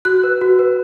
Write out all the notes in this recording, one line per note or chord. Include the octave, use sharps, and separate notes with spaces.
F#4 F#6
B4
F#4
B4